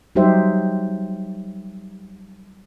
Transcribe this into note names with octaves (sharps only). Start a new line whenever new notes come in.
F#3 G3 D#4 G4 C5 E5